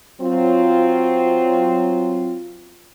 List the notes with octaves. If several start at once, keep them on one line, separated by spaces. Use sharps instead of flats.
F#3 C4 F4